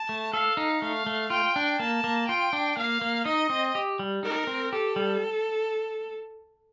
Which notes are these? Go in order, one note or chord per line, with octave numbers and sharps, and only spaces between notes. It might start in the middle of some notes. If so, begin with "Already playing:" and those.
Already playing: A5
A3
A4 F5
D#4
A3 F5
A3
F4 G5
D4
A#3 A5
A#3
F4 G5
D4
A#3 F5
A#3
D#4 D#5
C4
G4
G3
D#4 A#4
C4
G4 A4
G3